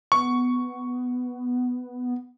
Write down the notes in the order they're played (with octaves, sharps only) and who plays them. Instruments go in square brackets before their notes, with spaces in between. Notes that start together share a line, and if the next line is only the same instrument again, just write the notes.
[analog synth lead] B3 [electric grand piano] C#6